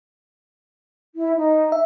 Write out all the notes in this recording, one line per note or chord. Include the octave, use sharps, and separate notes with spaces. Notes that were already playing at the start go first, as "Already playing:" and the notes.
E4
D#4
E5